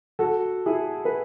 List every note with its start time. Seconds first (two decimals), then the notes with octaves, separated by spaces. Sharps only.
0.19 F#4 A4
0.66 E4 G#4
1.05 B4